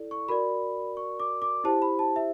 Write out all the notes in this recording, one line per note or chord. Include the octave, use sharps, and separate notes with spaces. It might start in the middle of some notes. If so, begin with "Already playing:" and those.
Already playing: E4 A4 D5
C#6
F#4 A#4 D5 B5
C#6
D6
D6
E4 G4 C5 A5
B5
A5
E5